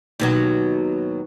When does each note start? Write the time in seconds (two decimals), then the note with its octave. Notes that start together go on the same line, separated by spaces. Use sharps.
0.20 D#2 B2 F#3